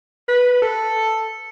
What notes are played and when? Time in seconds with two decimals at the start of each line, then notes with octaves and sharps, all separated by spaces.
0.28 B4
0.62 A4